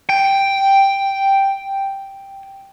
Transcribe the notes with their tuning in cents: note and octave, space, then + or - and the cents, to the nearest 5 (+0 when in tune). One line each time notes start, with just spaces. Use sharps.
G5 +0